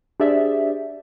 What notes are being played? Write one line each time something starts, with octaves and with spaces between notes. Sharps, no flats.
D4 G4 G#4 C5 D5 E5